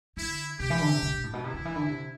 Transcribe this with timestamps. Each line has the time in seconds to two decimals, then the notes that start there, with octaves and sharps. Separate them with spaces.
0.17 D3 E4
0.60 C3 G4
0.70 E3
0.81 D3
0.91 C3
1.02 C3
1.13 B2
1.23 A2
1.33 B2
1.44 C3 E4
1.54 D3
1.65 E3
1.76 D3
1.86 C3